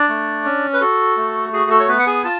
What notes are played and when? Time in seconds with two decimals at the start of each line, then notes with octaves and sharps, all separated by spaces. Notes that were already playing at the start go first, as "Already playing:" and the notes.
Already playing: D4 D5
0.09 A3
0.45 C#4
0.73 B4
0.81 F#4 A4
1.17 A3
1.53 F#4 G#4
1.71 A4
1.80 C#5
1.88 B3 B4
1.99 F#5
2.07 G#4 G#5
2.24 F4 A5